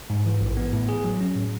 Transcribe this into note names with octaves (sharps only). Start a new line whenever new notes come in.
G#2
E3
A1
B3
A2
G#4
F#3
C#4
A2